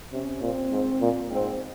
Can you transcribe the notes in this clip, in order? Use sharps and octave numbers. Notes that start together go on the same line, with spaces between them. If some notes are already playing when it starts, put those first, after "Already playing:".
C3 C#4
A#2 C4
G#2
A#2
G#2 C4